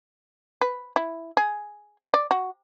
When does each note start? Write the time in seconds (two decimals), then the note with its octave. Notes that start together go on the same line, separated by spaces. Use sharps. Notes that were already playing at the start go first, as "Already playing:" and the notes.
0.61 B4
0.96 E4
1.37 G#4
2.14 D5
2.31 F#4